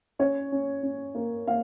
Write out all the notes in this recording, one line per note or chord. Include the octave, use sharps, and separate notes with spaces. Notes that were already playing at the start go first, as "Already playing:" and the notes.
C#4 C#5
C#4
C#4
A#3
A#3 F5